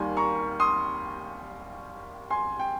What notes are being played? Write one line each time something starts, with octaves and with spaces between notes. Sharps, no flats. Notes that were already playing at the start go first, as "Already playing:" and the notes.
Already playing: D#2 D#3 G3 A#3 G#5 C6
A#5 C#6
C6 D#6
G#5 C6
G5